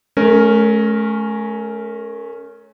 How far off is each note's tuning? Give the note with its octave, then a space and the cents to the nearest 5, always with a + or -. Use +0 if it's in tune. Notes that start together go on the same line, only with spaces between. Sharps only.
A3 -35 C#4 +0 A#4 +0